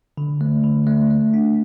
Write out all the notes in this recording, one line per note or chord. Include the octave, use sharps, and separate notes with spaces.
D3
A3
D3
A3
A3
D4